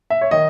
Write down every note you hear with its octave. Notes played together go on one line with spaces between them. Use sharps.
E5
C#5
D#3 D#5